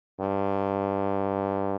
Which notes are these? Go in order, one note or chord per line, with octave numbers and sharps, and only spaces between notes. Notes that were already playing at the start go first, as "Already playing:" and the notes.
G2